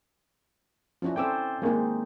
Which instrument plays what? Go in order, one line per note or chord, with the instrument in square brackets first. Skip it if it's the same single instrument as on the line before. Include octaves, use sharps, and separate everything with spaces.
[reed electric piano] F3 F#4 [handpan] C#4 D4 E4
[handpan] C4 A4 C5 [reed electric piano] G5 D6 E6
[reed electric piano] D#3 G#3 A#3 [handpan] C4 D#4